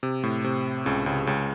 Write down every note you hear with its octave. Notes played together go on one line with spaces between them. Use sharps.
C3
A2
C3
C#2 C#3
C#2 C#3
C#2 C#3